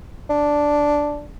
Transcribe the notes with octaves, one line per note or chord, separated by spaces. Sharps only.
D4